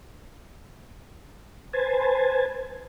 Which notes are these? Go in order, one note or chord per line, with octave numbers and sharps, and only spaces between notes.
B4 C5 G#5 A5